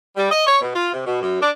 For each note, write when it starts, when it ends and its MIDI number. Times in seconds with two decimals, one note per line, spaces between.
0.16 0.30 55
0.30 0.43 75
0.46 0.60 73
0.61 0.74 47
0.75 0.90 65
0.93 1.04 48
1.05 1.21 47
1.22 1.40 42
1.41 1.50 62